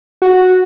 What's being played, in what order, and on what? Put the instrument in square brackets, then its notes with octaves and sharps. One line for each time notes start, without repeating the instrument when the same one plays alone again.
[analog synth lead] F#4